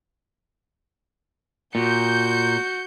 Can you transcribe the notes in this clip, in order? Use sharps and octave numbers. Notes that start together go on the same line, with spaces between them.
A#2 F#4 G6 C#7